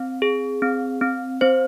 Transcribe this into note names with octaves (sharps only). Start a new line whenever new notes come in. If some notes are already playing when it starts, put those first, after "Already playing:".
Already playing: C4
G#4
C4
C4
C4 C5